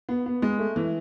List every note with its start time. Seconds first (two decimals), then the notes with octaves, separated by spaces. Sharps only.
0.09 B3
0.26 B3
0.42 G#3
0.59 A3
0.76 E3